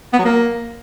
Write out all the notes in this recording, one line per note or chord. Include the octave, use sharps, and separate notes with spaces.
B3
F#3
A#3